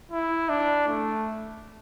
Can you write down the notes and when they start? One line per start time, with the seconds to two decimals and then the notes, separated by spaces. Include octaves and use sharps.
0.12 E4
0.49 D4
0.88 A3